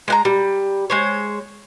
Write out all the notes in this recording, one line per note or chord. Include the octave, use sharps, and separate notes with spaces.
G#3 F#5 A#5
G3
G#3 C5 C#5